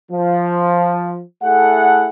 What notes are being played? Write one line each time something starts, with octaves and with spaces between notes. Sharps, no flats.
F3
A3 E4 G#4 A4 F#5